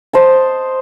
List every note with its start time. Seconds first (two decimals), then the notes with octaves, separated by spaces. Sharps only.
0.13 C5 D#5 A5